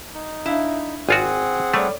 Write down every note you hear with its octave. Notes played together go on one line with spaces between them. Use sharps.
D#4
D4 E4 F5
G#1 C4 F4 F#4 G#4 F#5 G#5
G3 A3 A4 C#5 D5